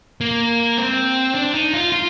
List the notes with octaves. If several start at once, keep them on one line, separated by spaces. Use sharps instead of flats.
A#3
C4
D4
D#4
F4
F4